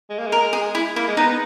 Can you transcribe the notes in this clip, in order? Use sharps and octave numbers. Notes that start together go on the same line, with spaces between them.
G#3
A#3
G#3
A#4
G#4
E4
A#3 E4
G#3
B3 D#4
B3